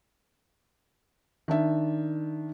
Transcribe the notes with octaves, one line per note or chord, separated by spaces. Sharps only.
D#3 D4 E5